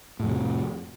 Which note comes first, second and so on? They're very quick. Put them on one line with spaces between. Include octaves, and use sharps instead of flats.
A2 F2 C3